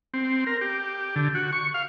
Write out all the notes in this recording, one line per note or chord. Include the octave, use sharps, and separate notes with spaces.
C4
A#4
G4
D3
F#4
C#6
F5